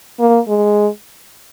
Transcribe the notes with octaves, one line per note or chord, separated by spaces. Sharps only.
A#3
G#3